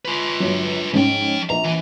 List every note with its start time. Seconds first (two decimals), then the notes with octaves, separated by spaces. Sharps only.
0.05 F4 B4
0.40 G1 F#3
0.93 G#2 F3 C#4 G5
1.50 A#1 A#5
1.64 E3